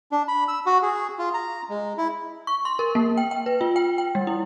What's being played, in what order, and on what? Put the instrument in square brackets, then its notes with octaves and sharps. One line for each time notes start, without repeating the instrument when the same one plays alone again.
[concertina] D4
B5
E6
F#4
G#4
F4
A#5
G#3
E4
[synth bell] C#6
C6
A#4
A#3
G5
G5
B4
F4
G5
G5
G3
E4